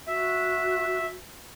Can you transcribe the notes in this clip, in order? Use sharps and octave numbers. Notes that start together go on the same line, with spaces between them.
F#4 E5